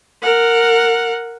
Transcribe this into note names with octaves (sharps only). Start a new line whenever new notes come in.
A#4 F#5